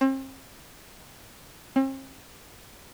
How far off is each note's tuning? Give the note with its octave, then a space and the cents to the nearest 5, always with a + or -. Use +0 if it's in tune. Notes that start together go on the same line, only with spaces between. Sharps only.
C4 +40
C4 +45